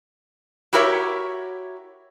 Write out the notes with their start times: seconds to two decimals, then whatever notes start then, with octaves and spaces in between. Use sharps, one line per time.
0.73 E4 F#4 G4 A#4 C#5 E5